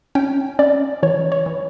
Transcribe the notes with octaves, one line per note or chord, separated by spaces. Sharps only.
C#4 G5
C#4 D5
E3 C#5
C#5
E3